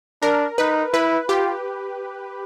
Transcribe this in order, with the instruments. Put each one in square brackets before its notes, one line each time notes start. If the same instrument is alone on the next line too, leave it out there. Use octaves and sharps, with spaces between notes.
[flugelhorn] D4 [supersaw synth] A#4
[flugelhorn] D#4 [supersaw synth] B4
[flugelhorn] E4 [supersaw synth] B4
[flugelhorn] F4 [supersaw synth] G4